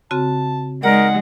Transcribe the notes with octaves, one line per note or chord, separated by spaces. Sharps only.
C#3 C4 F#4 A5
G#3 D#4 A#4 D5 F#5